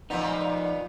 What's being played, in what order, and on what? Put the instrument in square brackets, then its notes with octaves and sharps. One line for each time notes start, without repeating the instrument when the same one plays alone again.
[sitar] A#2 B3 [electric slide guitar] F3 D#4